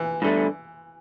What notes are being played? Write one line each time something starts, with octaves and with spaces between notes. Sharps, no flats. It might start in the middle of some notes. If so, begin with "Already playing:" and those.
Already playing: E3
G2 D3 A3